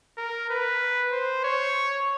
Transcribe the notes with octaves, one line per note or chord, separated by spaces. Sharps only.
A#4
B4
C5
C#5